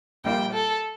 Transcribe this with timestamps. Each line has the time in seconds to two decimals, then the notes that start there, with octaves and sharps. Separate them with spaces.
0.24 A#1 A#2 G3 A#3 F4 G5
0.53 A4